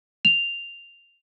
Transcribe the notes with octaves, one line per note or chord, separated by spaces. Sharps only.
F7